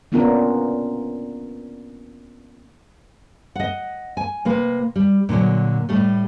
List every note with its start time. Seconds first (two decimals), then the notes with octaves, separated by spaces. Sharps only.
0.12 A#3 B3 C#4 D4 F4 A#4
3.56 D#5 F#5
4.17 G#5
4.45 C3 A#3 B4
4.96 G3
5.29 A#2 D3 D#3 F#3
5.89 A2 G3 A3